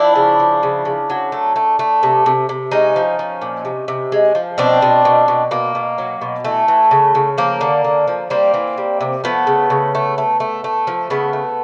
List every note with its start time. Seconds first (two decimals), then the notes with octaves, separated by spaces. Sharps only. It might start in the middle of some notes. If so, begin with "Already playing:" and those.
Already playing: F3 D4 E4
0.16 C#3
0.39 F3
0.63 C#3
0.85 C#3
1.10 F#3
1.32 A3
1.56 A3
1.79 A3
2.03 C3
2.26 C3
2.49 C3
2.72 G#3 C#4 D#4
2.96 F3
3.19 F3
3.42 A#2
3.65 C3
3.88 C3
4.12 G#3
4.35 F3
4.58 B2 C4 D4
4.82 B2
5.05 B2
5.28 B2
5.51 B2 A#3
5.75 B2
5.98 F#3
6.21 B2
6.44 E3 A3
6.68 E3
6.91 C#3
7.15 C#3
7.38 F3 A#3
7.61 D3
7.84 D3
8.08 F3
8.30 G3 A#3 C4
8.54 E3
8.78 G3
9.01 C3
9.24 F3 A3 B3
9.47 C#3
9.70 C#3
9.95 A3
10.18 A3
10.40 A3
10.64 A3
10.87 F3
11.10 C#3 A3 B3
11.33 A3